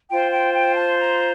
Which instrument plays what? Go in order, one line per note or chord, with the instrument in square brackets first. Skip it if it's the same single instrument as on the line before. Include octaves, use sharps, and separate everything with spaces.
[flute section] F4 C5 G5
G5
G5
A5
A#5